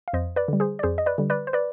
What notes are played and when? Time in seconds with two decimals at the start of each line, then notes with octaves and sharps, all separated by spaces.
0.08 F5
0.13 F2 C5 D#5
0.36 B4 D5
0.48 D3 G3
0.60 G#4 C5
0.79 D5
0.83 F2 G#4 C5
0.98 D#5
1.06 B4 D5
1.18 D3 G3
1.30 B4 D5
1.47 C5
1.53 B4 D5